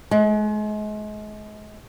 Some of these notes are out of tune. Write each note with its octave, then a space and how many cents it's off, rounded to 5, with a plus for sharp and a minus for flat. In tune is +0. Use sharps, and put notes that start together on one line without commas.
G#3 +35